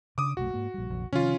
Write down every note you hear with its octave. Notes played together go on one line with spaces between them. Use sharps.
C#3 D4 D6 D#6
F1 B1 A3 F#4
G#2 A#3
A#1 G3
F1 A#1
C3 D#3 F3 C#4 F4